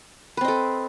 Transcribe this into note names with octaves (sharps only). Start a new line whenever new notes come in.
C4 A4 B4 D#5